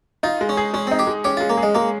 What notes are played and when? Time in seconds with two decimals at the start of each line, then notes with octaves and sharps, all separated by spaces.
0.23 D#4 F4
0.41 G#3
0.49 C#4
0.57 G#4
0.73 G#3 C#4
0.87 C4 D#4
0.99 G4
1.07 G#3
1.24 C#4 G4
1.37 G#3 F4
1.49 A#3
1.57 G#4
1.63 G#3
1.75 G#3 A#3